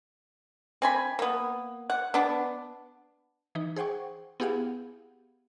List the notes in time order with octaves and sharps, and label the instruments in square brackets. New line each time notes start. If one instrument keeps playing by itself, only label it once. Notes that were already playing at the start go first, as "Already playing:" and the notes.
[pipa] C4 G#5 B5
A#3 B3
F#5
B3 D4
[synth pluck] E3 D#4
G#4 C5 F#5 G5 C#6
B3 E4 G4 G#4 F5 F#5